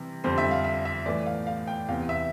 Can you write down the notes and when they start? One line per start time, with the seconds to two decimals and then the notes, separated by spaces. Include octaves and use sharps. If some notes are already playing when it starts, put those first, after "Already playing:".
Already playing: C3 E3 G3
0.24 F2 D3 G3 C5
0.38 E5
0.51 F5
0.64 E5
0.85 E5
1.06 A2 E3 A3 D5
1.26 F5
1.47 F5
1.68 G5
1.88 E2 C3 E3 F5
2.09 E5